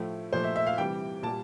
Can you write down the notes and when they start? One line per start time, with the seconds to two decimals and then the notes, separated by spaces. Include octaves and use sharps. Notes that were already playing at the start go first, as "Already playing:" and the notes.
Already playing: A2 F3 A3
0.33 A#2 F3 A3 C5
0.44 E5
0.56 E5
0.66 F5
0.78 C3 E3 G3 G5
1.23 A#2 G3 A5